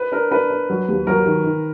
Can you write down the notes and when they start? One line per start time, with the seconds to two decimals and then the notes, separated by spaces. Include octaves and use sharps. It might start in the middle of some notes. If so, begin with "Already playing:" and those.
Already playing: B4
0.12 D4 A#4
0.31 D4 B4
0.50 D4
0.70 F#3
0.89 D#2
1.07 F#3 A#4
1.25 D#3
1.44 D#3